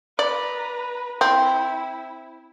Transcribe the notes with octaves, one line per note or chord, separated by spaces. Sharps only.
B4 D5 A#5
C4 E4